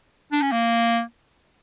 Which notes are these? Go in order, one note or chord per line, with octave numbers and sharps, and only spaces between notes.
D4
C#4
A#3